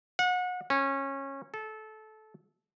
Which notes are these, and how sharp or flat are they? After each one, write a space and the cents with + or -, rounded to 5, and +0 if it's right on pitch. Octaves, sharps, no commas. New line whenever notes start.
F#5 -30
C#4 -20
A4 -20